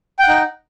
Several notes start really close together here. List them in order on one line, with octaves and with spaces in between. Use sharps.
G5 F#5 D#4